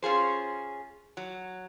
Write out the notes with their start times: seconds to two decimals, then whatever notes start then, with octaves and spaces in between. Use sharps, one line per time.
0.02 C#4 F4 G#4 C5
1.17 F#3